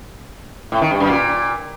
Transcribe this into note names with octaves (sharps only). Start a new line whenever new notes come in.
A2
D#3
G2
F#2
A#2